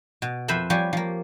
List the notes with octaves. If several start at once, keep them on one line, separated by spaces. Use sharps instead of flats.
B2
F2 B4 C5 E5 B5
F3 G3 G4 C#5 G#5
F3 A#3